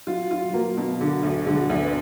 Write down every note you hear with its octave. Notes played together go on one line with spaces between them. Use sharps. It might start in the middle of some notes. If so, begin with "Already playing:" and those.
F#3 F4 F#4
F4
F#3 A#3 F#4
B2
D3
D2
D3 G#3 G#4
F#3 F#4
D2 D4 D5
B3 B4